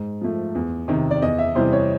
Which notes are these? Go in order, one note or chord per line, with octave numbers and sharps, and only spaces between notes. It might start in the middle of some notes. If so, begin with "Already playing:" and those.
Already playing: G#2
F3 A3
E2
C3 D#3
D5
E2 D#5
E5
C3 E3 G3 C5
C#5